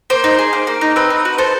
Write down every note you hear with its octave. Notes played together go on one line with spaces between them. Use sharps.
A#3 C5
D#4
G#4
A#3
A#3
D#4
C4 B4
D#4
F#4
A4 C5